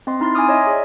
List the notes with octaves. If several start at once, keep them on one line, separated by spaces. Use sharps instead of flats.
C4 D#5 C6
C4 D#4 E4 C6 A6
G#5 A#5 C6 D6 D#6 F6
C#5 D#5 E5
G#4 D5